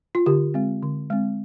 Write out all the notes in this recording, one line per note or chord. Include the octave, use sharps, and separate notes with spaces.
F4
D3 G4
G#3 C4
D3
G#3 C4